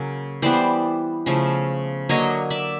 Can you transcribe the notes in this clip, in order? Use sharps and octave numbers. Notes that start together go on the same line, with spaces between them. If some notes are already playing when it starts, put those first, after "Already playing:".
Already playing: C#3 F#3 A#3
E3 G3 B3 C5 D5
C#3 F3 A3
D3 F#3 A#3 C#5 D#5
D5 E5